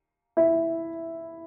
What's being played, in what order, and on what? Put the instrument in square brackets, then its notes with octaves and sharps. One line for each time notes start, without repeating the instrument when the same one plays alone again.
[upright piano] E4